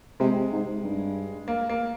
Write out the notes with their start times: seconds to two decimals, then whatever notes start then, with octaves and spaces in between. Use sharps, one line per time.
0.20 C3 G#3
0.52 G#2
0.83 G2
1.48 A#3
1.69 A#3